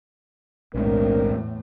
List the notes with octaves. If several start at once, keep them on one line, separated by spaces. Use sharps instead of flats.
B1 E2 A2 G#3 C4 D4 A#4